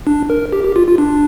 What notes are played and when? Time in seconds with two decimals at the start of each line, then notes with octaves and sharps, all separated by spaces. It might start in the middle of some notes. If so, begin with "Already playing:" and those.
0.07 D4
0.30 A#4
0.52 G4
0.64 G4
0.76 F4
0.87 F4
0.98 D4